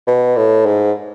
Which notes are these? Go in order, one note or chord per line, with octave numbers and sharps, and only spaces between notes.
B2
A2
G#2